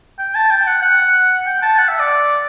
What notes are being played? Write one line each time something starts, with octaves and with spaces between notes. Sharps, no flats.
G5
A5
G5
F#5
F#5
G5
A5
F#5
E5
D5